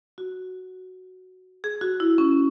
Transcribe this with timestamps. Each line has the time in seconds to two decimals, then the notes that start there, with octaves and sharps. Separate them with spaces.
0.18 F#4
1.64 G#4
1.81 F#4
2.00 E4
2.18 C#4